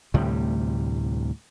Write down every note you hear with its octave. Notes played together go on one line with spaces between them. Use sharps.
D2 A2 C3 G3